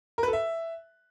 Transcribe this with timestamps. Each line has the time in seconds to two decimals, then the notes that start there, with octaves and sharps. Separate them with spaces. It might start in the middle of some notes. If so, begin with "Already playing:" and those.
0.18 A#4
0.23 B4
0.28 A4
0.33 E5